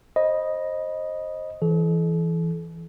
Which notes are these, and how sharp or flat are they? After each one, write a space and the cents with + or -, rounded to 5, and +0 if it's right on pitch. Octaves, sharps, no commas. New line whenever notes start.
C5 +20 D#5 +0 B5 -20
E3 +0 A4 -45